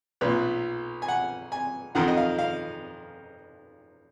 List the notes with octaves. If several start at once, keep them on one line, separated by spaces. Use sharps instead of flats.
B1 A#2 B4
G#5
F#5
G#5
F2 D#3 F#5
D#5
F5
F5